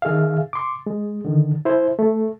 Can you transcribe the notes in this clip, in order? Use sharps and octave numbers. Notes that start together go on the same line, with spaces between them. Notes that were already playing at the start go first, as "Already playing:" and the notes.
D#3 G#4 E5 F5
C6 D6
G#3
D3 D#3
E4 C5
A3